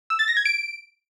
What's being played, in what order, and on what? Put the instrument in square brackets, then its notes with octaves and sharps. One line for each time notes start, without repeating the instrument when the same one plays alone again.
[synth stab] E6
A6
A#6
G#6
D7